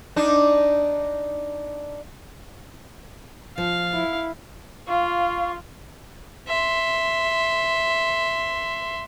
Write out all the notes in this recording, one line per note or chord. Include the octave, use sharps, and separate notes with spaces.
D4 D#4
F3 F5
E4
F4 F5 C#6
E5 C6